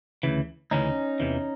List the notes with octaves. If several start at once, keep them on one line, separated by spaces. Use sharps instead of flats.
D2 C#3 E3
D2 C#3 E3 C#4 D#4
E2 C3 E3